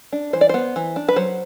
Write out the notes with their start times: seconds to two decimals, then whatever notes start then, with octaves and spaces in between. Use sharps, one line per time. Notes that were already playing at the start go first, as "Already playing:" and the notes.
0.12 D4
0.33 E3 C5
0.41 D5
0.49 B3 C5
0.76 E3
0.96 D4
1.08 B4
1.16 F#3 C5